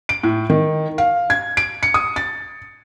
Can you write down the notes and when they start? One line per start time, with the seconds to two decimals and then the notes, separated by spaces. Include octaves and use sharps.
0.09 D7
0.23 A2
0.50 D#3
0.98 F5
1.30 G#6
1.57 D7
1.83 C#7
1.94 D#6
2.16 A6